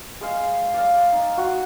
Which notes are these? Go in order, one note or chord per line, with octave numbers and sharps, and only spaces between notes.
G#3 F5
D5 F5
D#4
F#4